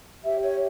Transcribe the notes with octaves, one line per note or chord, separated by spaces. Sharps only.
G4 C#5 E5
C#5